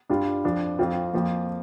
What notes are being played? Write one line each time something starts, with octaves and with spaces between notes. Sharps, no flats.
G2 G3 D4 F4
F2 F3 D4
F2 F3 C4 F4
F2 F3 A#3